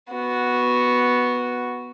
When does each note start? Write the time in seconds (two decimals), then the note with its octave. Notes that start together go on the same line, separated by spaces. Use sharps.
0.11 B3 F#4